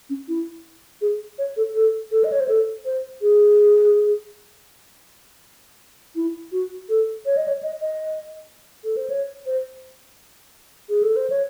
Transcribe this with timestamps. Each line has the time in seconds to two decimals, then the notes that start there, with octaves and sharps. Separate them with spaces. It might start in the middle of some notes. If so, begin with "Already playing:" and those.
0.10 C#4
0.28 E4
1.01 G#4
1.38 C#5
1.57 A4
1.75 A4
2.12 A4
2.24 D#5
2.32 C#5
2.40 C5
2.48 A4
2.85 C5
3.22 G#4
6.16 E4
6.52 F#4
6.89 A4
7.26 C#5
7.37 D#5
7.48 C#5
7.63 D#5
7.81 D#5
8.84 A4
8.97 C5
9.10 C#5
9.46 C5
10.89 G#4
11.03 A4
11.16 C5
11.30 C#5